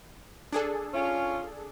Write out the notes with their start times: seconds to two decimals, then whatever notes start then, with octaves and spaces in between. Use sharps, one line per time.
0.53 D4 G#4 A4
0.94 C#4 F4